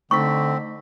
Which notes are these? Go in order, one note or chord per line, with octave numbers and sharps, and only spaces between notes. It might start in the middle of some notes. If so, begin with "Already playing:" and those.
D3 A3 C4 D#4 C#6 B6